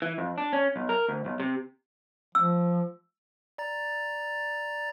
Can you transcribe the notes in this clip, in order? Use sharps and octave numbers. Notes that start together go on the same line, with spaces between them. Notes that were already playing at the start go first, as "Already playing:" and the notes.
E3
F2
D4
C#4
B1
A#4
D2
B1
C3
F3 E6
D5 A#5 A6